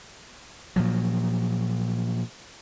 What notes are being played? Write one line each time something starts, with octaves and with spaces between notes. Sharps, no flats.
A#2 F3 F#3